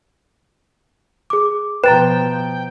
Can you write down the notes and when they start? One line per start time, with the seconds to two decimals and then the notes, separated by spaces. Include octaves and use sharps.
1.30 G#4 D6
1.84 B2 F3 B4 G5 A#5 A6 E7